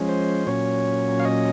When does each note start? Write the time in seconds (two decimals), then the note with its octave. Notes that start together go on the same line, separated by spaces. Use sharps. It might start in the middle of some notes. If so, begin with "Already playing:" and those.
Already playing: F3 G#3 C#4
0.09 C5
0.47 A#2 F#3 C#4 C#5
1.20 F5
1.25 D#5